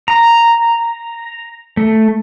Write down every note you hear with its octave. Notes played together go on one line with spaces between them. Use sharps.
A#5
A3